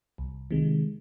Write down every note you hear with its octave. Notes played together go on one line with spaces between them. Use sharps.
C2
C3 D#3 G#3